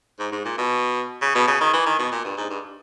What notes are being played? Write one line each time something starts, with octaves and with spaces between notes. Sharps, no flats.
G#2
G#2
A#2
B2
C#3
B2
C#3
D#3
E3
D#3
B2
A#2
G2
G#2
G2